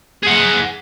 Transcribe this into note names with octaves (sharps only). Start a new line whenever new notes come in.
G#4 F#5